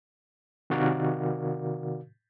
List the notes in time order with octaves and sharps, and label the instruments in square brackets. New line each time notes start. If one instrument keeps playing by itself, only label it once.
[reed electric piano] C3 D#3 F#4 A#4 D5 F5